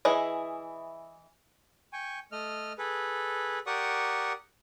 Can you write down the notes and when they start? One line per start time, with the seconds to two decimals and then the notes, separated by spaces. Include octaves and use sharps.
0.05 E3 E4 G#4 D#5
1.93 G5 G#5 C#6
2.32 A3 D#5 F6
2.78 G#4 A4 B4
3.67 G4 A#4 D5 F#5 C#6 D#6